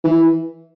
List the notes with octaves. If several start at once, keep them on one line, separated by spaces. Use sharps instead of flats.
E3